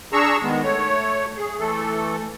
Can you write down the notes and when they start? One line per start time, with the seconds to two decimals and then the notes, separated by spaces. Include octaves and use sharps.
0.13 D4 G#4 A#5 C#6 E6
0.43 D#3 G#3 B3
0.63 A3 C#5
1.37 G#4
1.59 E3 A3 A4